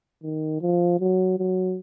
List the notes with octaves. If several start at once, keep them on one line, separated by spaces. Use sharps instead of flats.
D#3
F3
F#3
F#3